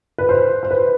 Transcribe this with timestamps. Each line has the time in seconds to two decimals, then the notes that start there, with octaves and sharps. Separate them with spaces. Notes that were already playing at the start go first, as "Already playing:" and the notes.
0.18 B4
0.29 C5
0.63 C5
0.71 B4